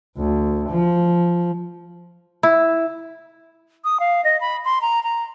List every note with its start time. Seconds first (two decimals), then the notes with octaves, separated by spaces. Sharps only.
0.18 D2
0.70 F3
2.43 E4
3.84 D#6
4.00 F5
4.24 D#5
4.41 B5
4.65 C6
4.82 A#5
5.04 A#5